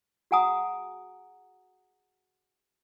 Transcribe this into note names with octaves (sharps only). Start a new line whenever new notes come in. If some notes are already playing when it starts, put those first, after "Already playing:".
F#4 G#4 F#5 G#5 A#5 D#6